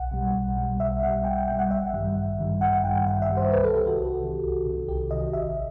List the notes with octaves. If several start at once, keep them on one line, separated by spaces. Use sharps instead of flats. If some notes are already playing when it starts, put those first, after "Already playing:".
Already playing: B1 F#5
B2 G3
B1
B2 G3
B1 E5
B2 G3 F#5
B1 G5
G5
B2 G3 G5
F#5
A1 E5
G2 D#3 G3
A1
G2 D#3 G3
A1 F#5
F#5
G2 D#3 G3 G5
G5
A1 F#5
E5
G2 D#3 G3
C5
C2 B4
A4
C3 D#3 G4
F#4
C2
C3 D#3
C2
C3 D#3
C2 G4
C3 D#3 D#5
A1 E5